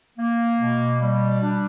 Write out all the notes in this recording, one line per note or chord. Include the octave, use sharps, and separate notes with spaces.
A#3
B2
G3
D4